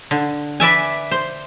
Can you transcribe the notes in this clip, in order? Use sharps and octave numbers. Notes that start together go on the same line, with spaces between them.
D3
B4 D5 E5 G#5
C5